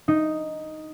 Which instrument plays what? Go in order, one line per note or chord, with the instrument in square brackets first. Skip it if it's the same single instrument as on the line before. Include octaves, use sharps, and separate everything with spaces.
[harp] D#4